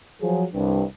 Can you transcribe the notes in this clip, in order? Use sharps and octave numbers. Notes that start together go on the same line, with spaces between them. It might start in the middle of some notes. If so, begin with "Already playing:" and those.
F3 F#3 G#4
C2 G2